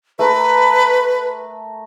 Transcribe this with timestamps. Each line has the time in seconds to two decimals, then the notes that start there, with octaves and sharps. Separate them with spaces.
0.19 A3 A#4 B4